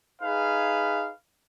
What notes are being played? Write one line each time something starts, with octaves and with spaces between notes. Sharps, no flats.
D#4 G#4 B4 F5